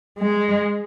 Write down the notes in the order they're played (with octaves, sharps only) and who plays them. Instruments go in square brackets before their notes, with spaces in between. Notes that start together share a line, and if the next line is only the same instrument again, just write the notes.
[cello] G#3